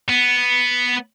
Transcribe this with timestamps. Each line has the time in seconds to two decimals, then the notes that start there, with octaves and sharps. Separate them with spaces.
0.09 B3